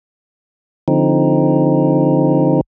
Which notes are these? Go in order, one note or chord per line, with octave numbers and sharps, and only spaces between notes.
D3 F3 C4 D#4